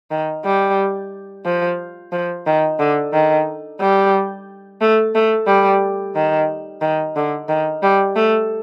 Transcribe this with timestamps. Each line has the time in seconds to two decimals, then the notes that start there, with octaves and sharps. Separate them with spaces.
0.11 D#3
0.45 G3
1.45 F3
2.12 F3
2.46 D#3
2.79 D3
3.13 D#3
3.80 G3
4.81 A3
5.15 A3
5.47 G3
6.15 D#3
6.81 D#3
7.16 D3
7.49 D#3
7.83 G3
8.16 A3